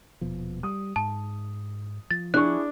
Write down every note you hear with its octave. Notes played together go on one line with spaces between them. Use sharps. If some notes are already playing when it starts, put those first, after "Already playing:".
D#1 B2 F3
G3 D#6
G#2 A5
F3 A6
D4 E4 G#4 C#6 F#6